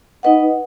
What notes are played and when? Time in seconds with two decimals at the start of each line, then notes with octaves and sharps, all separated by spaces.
0.23 D#4 B4 D#5 F#5